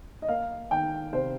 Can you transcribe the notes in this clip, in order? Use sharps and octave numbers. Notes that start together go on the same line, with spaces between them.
D#5
A#3 F5
D#3 G5
C3 C5